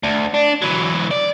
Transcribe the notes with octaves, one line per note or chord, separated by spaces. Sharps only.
D2
D4
E3 F#3
D5